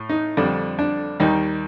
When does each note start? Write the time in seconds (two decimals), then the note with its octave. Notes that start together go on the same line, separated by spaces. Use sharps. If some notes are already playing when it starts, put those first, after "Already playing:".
Already playing: A2
0.09 D#4
0.37 F2 D3 G3 D4
0.79 D4
1.20 D#2 D#3 G3 D#4